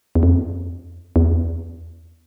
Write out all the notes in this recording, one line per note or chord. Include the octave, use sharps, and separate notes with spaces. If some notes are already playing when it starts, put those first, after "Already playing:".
E2
F2
E2